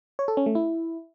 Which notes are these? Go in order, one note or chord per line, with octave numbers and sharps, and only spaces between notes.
C#5
A4
C#4
A3
E4